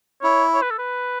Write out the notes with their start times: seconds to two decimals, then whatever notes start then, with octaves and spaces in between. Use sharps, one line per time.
0.23 E4 C#5
0.54 C#5
0.62 B4
0.71 A4
0.79 B4